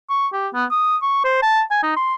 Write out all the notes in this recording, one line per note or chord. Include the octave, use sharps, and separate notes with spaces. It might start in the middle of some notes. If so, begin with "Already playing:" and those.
C#6
G4
B3
D#6
C#6
C5
A5
G#5
D#4
C6